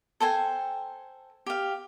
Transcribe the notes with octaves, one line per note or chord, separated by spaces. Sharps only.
A4 C5 G5 G#5
G4 F5